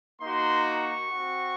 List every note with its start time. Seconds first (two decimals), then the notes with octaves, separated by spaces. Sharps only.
0.21 A#3 D#4 F#4 C6
0.66 C#6
1.10 C4 F#4